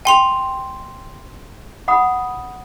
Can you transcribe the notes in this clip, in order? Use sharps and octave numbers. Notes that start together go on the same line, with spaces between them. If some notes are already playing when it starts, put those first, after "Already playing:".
G5 G#5 C6 F7
F#5 B5 D#6